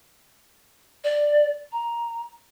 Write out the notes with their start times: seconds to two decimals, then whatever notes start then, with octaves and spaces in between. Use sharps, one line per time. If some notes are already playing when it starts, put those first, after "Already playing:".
1.04 D5
1.72 A#5